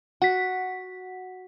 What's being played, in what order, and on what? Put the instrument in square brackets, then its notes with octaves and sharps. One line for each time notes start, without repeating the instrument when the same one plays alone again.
[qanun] F#4 [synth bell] F#5 B6